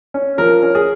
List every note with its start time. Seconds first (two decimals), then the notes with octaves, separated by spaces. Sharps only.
0.14 C#4
0.38 F3 A#4
0.62 C#4
0.75 G#4